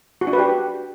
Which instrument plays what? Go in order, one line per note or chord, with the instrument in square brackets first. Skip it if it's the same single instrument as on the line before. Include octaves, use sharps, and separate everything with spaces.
[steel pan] F#4
D4
B4
G4